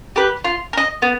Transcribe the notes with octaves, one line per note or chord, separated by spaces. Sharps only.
G4 B4
F4
A#4
D#5
B3